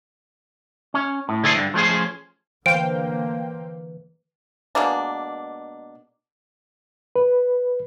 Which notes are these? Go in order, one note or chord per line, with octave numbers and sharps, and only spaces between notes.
C#4
A2
D3 A3 E4 G#4 A4 C5
G2 D3
F3 A3 C#4 G#4 C5
D3 E3 A#3 C5 F5 G5 D7
B2 G#3 A#3 D4
B4